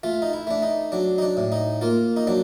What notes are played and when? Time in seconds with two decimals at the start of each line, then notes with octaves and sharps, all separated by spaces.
0.03 A3 F4
0.22 D#4
0.33 E4
0.47 A3 D4
0.62 D#4
0.92 F#3 D4
1.18 D#4
1.22 D4
1.37 A2
1.52 D#4
1.81 A#3 F4
2.17 D#4
2.27 F#3 D4